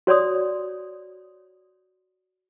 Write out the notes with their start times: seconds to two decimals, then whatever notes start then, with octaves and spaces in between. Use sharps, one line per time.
0.07 F#4 C#5 D5 C6 D#6